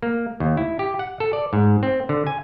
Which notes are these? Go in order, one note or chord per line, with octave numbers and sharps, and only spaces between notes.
A#3
D#2
E4
G4
F#5
A4
D5
G#2
C4
D3
G#5